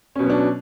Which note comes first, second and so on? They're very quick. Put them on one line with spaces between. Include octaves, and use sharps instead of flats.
C#4 B2 F#3 B3 D4